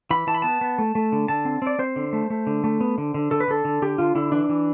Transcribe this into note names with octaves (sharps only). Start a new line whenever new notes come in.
E3 B5
E3 A5
B5
B3 A5
B3
A3
A3
D3
D3 A5
C4
C4 D5
C4 C5
D3
A3
A3
D3
A3
B3
D3
D3
D3 A4
B4
D3 A4
D3
D3 G4
D3 F4
D3 E4
E3 D4
E3